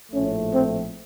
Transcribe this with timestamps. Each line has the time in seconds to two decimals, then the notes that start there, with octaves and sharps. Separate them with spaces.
0.11 A#1 A2 F3 A3 C#4
0.50 C4